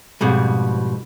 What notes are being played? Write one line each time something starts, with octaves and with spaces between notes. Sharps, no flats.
F2 G#2 B2 G3